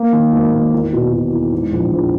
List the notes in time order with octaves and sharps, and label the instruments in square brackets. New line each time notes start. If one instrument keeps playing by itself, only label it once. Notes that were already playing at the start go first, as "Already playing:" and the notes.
Already playing: [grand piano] A#3
D#3
G#1
G#1
E2
B2
B2
E2
G#2
A#1
A#1